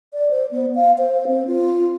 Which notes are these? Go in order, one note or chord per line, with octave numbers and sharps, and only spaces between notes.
D5
C5
B3
F5
C5
C4
F4